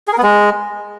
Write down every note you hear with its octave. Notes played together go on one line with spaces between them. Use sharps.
G#4
A#4
B3
G#3